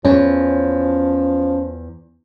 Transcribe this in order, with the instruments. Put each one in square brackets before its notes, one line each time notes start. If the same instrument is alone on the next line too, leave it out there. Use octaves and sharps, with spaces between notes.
[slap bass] E2 [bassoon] F3 [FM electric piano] C#4